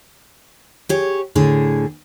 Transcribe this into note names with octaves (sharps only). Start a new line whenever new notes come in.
G4 G#4 C#5
A2 D3 G#4